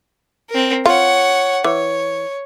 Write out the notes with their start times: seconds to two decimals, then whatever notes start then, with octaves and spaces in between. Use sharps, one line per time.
0.50 C4 A#4
0.86 F4 C#5 F#5
1.64 E3 C#5